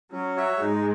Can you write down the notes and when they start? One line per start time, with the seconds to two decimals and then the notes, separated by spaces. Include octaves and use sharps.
0.12 F#3 C#4
0.37 F#4 C#5 E5
0.60 G#2 G#3 D#4